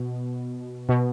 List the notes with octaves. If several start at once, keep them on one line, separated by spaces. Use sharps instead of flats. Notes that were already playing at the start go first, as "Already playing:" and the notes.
Already playing: B2
B2